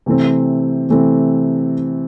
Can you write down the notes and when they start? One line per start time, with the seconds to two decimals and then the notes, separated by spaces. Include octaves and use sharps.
0.06 C3 E3 A3 C4
0.89 C3 E3 A3 C4